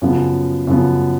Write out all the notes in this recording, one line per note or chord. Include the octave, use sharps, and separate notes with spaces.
F#2 C#3 F3 B3
F#2 C#3 F3 B3